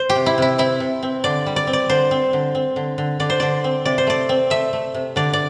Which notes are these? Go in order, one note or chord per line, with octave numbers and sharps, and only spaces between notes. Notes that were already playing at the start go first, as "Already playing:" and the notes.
Already playing: C5
G4
C3
E4
C3 E4
C4 E4
C3
C4
D3 D5
G3
D5
C4
D5
D3 C5
C4
D3
C4
D3
D3
D3 D5
C5
D3 D5
C4
C3 D5
C5
A3 D5
C4
A3 E5
A3
C3
D3 D5
D5